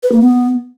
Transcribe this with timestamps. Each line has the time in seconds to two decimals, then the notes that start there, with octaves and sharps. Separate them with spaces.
0.03 B4
0.12 A#3
0.21 B3